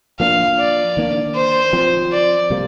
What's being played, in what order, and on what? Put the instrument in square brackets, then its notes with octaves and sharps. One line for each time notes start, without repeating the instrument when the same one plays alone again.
[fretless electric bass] F3 A#3 D4 [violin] F5
[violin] D5
[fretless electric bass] D#3 A#3 D4
[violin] C5
[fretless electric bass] F3 C4
[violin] D5
[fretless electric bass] C3 G3 A#3